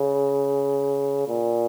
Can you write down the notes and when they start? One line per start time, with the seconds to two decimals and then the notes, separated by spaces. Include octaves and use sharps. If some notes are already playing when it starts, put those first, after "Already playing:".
Already playing: C#3
1.28 A#2